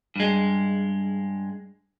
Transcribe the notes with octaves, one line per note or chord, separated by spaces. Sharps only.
G2 G#3